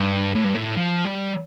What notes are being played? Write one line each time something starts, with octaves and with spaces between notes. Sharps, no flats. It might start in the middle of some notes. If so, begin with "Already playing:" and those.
Already playing: G2
A2
G2
A2
F3
G3